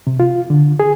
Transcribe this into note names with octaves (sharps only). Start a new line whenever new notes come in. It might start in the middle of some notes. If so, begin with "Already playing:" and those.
C3
F4
D3
G#4